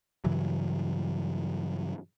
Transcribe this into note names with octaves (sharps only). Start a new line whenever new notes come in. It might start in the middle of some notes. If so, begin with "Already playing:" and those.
G2 C#3 E3 F#3